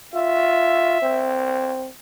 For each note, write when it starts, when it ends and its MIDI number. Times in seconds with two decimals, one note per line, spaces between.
0.14 1.02 65
0.14 1.35 76
1.02 1.88 60